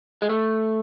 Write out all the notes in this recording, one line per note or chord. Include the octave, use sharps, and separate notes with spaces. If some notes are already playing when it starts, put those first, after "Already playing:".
G#3
A3